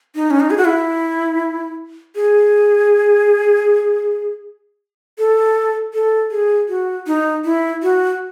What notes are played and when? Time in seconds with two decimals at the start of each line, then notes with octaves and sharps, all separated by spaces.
0.15 D#4
0.30 C#4
0.40 D#4
0.50 G#4
0.58 F#4
0.65 E4
2.16 G#4
5.18 A4
5.94 A4
6.31 G#4
6.68 F#4
7.07 D#4
7.45 E4
7.83 F#4